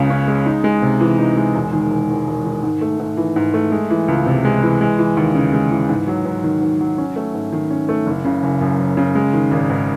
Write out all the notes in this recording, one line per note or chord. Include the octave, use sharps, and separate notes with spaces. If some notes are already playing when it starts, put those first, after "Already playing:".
Already playing: C#2 C#3 G#3 C#4
C#4
G#3
D#4
G#3
C3
E3
D#4
G#3
E1
D#3
E1
E2
E1
D#3
G#2
A3
G#2
E3
G#2
A3
G#3
E3
C#2
C3
G#3
E3
G#3
E3
D#2
C#3
G#3
E3
G#2
F#3
G#2
D#3
G#2
F#3
C#4
A3
G#2
D#3
C#4
A3
F#1
C#3
F#1
F#2
F#1
C#3
G#3
D#3
G#1
G#2